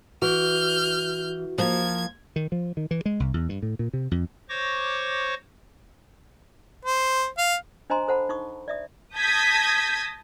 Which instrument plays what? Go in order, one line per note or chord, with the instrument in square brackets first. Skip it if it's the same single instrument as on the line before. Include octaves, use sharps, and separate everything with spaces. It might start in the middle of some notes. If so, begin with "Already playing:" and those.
[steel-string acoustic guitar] E3 [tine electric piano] F#4 [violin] F6 G6
[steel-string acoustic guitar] F3 A#3 [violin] G#6
[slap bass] D#3
F3
D#3
E3
G#3
C2
E2
G2
A2
A#2
C3
F2
[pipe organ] C5 C#5 C#6 D6 A#6
[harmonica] C5
F5
[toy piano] D4 C5 D#5 G#5 A#5 C6
A4 C5 F#5 A5 B5
D#4 C#6 D#6
D5 E5 D#6
[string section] A5 D#6 G6 G#6 A#6 B6